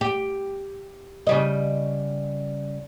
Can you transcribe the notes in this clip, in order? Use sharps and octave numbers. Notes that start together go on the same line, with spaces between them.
G4
C#3 G3 D#5